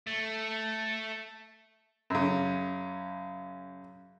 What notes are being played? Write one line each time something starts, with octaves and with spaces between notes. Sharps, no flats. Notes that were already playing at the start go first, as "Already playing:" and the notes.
A3
F#2 C#3